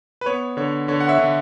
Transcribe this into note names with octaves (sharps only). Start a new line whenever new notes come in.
B4
B3 C#5
D3 C#5
D3 C#5
F#5
C#5 E5
D3